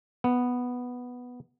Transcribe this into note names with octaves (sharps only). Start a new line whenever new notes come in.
B3